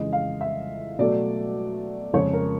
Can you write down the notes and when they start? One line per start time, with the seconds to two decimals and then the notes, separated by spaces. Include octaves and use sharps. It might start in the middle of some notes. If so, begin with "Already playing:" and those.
Already playing: F2 C#3 E3 G#3 D#5
0.13 F5
0.41 E5
0.99 B2 F#3 A3 D5
2.13 F2 C#3 F3 G#3 C#5
2.33 A#4